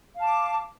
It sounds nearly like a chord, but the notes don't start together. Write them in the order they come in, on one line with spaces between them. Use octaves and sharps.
F5 A5 D6